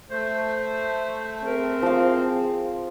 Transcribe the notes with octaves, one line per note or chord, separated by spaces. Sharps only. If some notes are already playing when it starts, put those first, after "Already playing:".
A3 C5
C4 G#4 A#4
F3 F5